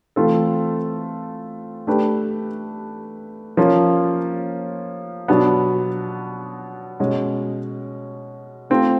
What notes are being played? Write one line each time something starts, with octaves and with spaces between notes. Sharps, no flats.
E3 A3 C4 F4 A4
A3 D4 G4 B4
F3 A#3 C#4 F4
B2 F#3 B3 D4
B2 G#3 C#4
A3 C4 F4